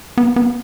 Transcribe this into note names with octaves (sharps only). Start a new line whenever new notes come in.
B3
B3